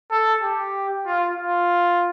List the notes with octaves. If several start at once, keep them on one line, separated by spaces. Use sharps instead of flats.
A4
G4
F4
F4